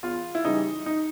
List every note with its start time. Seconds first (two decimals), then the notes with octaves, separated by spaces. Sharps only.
0.03 E2 F4
0.35 E4
0.45 C#3 E3 G3 D#4
0.86 D#4